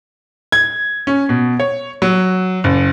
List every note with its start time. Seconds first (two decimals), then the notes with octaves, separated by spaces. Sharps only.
0.52 G#6
1.07 C#4
1.29 B2
1.60 C#5
2.02 F#3
2.64 F#1